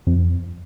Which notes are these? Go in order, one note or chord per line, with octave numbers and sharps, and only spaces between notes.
F2